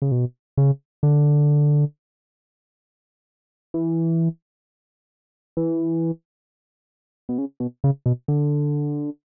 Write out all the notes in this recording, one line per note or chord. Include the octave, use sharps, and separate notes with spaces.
C#3
B2
C#3
D3
E3
E3
B2
C#3
B2
C#3
B2
D3